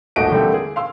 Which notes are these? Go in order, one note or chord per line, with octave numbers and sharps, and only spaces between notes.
D#1 G#1 A3 F#4 D#5 D7
D3 G3 A3 A#3 C4 E4
G#4
F5 C6 E6